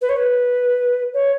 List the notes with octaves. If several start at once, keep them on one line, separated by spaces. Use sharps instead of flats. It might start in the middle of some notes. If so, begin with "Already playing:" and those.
B4
C#5
B4
C#5